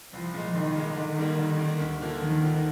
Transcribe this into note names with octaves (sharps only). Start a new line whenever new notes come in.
C2 F3
A#2 G#3
C2 D#3
A#2 G#3
D3 D#3
G3 A#3
D3
G3 A#3
D2
D3 F3 A#3
D2 D#3
D3 F3 A#3